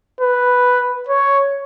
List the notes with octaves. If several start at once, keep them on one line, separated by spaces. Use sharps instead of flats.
B4
C#5